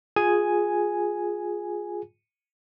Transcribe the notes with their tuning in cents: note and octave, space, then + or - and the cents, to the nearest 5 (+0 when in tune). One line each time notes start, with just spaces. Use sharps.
F4 +15 G#4 +0 G#5 +0